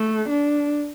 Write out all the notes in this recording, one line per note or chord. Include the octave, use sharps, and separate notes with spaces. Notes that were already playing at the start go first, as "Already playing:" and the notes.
Already playing: A3
D4